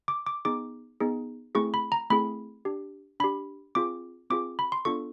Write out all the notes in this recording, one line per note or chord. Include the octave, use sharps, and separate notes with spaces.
D6
D6
B3 D#4 G#4 D6
B3 D#4 G#4
A3 C4 E4 G#4 C#6
B5
A#5
A3 C4 E4 G#4 B5
D4 G4
D4 G4 B5
C4 F4 G#4 D6
C4 F4 G#4 D6
B5
C6
B3 D4 F4 A4 C#6